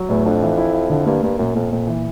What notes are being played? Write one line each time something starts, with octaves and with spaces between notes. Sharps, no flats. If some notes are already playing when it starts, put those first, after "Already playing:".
Already playing: F#3
E2 A2
F2 D4
E3
E4
E4
F2 D3
G2 A#3
G2 A#3
F#2 A#2
F2 A#2
F2 A#2
E3